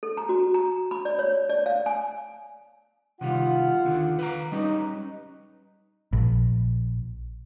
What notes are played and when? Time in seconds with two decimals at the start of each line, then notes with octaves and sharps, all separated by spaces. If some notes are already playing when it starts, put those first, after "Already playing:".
0.03 A4
0.17 A#5
0.29 F#4
0.54 A#5
0.91 B5
1.05 D5
1.19 C#5
1.49 D5
1.66 F5
1.86 G#5
3.21 C3 D#3 G3 F4 F#5
3.84 D#2 D3 D#3
4.19 B4 F5 A#5
4.52 G3 C#4 D#4 B4
6.13 A#1